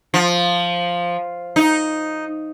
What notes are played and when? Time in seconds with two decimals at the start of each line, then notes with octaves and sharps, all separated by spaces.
0.14 F3
1.56 D#4